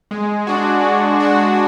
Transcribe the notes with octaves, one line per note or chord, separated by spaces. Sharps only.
G#3
D4 F#4
G#3
D4 F#4